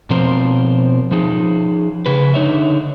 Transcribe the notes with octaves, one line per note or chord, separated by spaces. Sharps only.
B2 F3 C4 A#4 C5
F3 D#4 G#4
C#3 G#4 B4
D3 D#4 C#5 E5